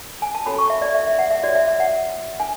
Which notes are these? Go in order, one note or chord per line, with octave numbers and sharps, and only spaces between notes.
G#5
A5
C#4 F#4 A4 C#5 B5
C#6
E5
D5
E5
E5
F#5
E5
D4 F#4 C#5 D5
E5
E5
F#5
D4 G#5